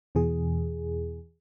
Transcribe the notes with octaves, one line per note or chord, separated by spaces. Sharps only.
E2 B2 E3 G#4